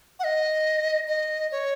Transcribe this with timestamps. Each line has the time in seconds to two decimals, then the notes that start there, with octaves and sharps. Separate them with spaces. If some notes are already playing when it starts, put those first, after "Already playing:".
0.19 F#5
0.24 D#5
1.08 D#5
1.52 C#5